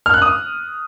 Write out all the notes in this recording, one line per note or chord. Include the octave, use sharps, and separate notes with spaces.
F6
F#6
D#6